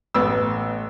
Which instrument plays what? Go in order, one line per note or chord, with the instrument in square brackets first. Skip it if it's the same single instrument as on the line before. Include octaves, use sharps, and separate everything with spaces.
[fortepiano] A1 B3 E6